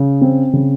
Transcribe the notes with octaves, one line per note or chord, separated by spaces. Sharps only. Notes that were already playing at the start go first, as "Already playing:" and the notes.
Already playing: C#3
C4
C#3